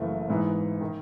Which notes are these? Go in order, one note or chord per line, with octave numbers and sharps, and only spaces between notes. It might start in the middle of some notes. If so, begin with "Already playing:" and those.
Already playing: F#1 F#2 E3 A3
G#2 E3 B3 D#4
D#3